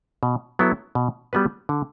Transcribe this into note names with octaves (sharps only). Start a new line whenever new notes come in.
B2
F#3 B3 E4 A4
B2
G3 B3 F#4 B4
D3